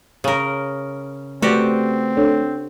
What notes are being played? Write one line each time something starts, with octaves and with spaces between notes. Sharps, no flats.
C#3 A#4
A3 C4 F#4 G4 B4 D5
D4 A4 C#5